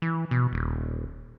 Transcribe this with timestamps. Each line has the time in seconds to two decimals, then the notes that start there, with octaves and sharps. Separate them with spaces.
0.02 E3
0.31 B2
0.53 D#1